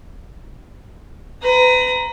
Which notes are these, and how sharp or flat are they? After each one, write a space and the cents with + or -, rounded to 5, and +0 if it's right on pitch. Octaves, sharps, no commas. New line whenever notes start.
B4 +35 A#5 +0